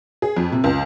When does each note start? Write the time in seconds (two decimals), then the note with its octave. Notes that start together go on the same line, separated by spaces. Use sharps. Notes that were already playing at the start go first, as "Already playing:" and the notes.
0.22 G#4
0.37 F2
0.52 C3
0.64 C#2